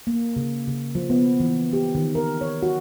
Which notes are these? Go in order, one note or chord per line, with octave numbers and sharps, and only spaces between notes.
A#3
C#3
C#3
F3
B3
E3
G4
D#3
A#4
C#5
F#4